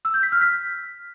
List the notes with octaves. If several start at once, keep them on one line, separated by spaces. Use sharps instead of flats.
E6
G6
B6
F6
B6